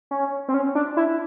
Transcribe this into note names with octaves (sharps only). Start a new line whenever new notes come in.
C#4
C4
C#4
D4
E4